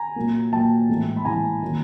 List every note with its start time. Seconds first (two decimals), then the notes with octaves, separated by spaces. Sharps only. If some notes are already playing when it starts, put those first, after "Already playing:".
Already playing: G#5 A#5
0.16 A#2 F#3 A#3
0.53 A#2 F#3 A#3 G5 A5
0.89 A2 E3 G#3
1.17 B5
1.25 A2 E3 G#3 G#5 A#5
1.62 D#3 F#3 A#3